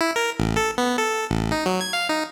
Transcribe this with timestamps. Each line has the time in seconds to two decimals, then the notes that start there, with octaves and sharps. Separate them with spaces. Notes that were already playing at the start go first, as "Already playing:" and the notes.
0.01 E4
0.16 A#4
0.40 A1
0.57 A4
0.78 B3
0.98 A4
1.31 A1
1.52 D#4
1.66 F#3
1.81 G#6
1.93 F5
2.09 D#4